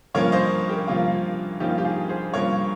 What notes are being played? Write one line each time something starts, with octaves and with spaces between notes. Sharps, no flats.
G2 F3 A#3 C#4 A#4 C#5
C5 D#5
G4 A#4
G2 F3 A#3 C#4 F4
G2 F3 A#3 C#4 D#4 G4
F4
G4
F4 G#4
G#4 C5
G2 F3 A#3 C#4 A#4 C#5